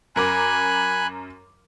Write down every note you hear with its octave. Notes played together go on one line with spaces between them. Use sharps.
F#2 A#4 G#5 B5 D6 F#6